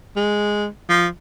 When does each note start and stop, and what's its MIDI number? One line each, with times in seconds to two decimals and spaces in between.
0.16 0.67 56
0.89 1.07 53